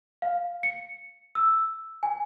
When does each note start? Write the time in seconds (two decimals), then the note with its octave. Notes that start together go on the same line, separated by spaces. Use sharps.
0.22 F5
0.63 C#7
1.35 E6
2.03 G#5